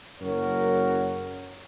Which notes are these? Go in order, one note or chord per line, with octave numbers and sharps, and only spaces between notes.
F#1 F#2 A#4 C#5 F#5